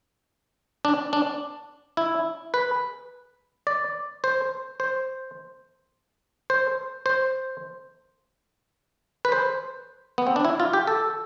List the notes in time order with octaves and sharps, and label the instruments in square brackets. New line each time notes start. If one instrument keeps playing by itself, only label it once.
[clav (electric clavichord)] D4
D4
E4
B4
D5
C5
C5
C5
C5
B4
C5
B3
C4
D4
E4
F4
G4
A4